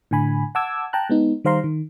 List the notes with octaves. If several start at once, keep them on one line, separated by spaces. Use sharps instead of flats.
A2 D3 G#5 B5
F#5 A5 D6 E6 G#6
G5 A5 A#5 F#6
G#3 B3 D#4
D#3 G3 C5 F5 A#5 C6
D#3